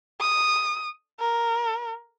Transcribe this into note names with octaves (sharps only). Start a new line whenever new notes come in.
D#6
A#4